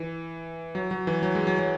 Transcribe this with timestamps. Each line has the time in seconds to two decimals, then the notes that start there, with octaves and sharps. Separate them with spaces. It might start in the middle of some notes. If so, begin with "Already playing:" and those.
Already playing: E3
0.75 F#3
0.91 F#3
1.07 E3
1.23 F#3
1.35 G#3
1.47 F#3
1.59 F#3